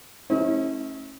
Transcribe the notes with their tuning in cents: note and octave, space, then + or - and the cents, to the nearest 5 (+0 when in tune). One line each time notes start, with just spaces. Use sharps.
A3 +0 C#4 -30 E4 -45